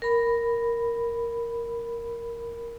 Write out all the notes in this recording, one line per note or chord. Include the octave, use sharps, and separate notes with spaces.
A#4 B5